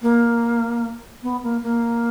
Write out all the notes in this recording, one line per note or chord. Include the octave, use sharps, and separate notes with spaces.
A#3
B3
A#3
A#3